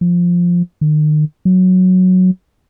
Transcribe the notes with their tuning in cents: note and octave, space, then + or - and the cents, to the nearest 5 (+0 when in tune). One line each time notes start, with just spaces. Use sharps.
F3 +5
D#3 -40
F#3 -5